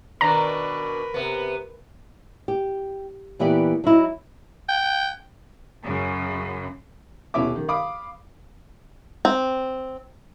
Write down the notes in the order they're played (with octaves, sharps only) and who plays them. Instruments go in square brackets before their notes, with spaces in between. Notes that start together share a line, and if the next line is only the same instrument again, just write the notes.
[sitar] B2 D#3 D4 [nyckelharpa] A#4 B4 [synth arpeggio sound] A#5
[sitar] C3 B3
[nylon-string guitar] G4
A#2 E3 B3 G4 D5
F#3 D#4 E4
[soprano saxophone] G5
[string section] F#2 C#3
[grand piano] D#1 B2 C#4 E4 E5 D6
D#3
F5 B5 D6 D#6
[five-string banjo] C4